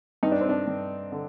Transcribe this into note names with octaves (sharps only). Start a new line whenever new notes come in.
G2 D#4
D4
C4
D4
G2
D3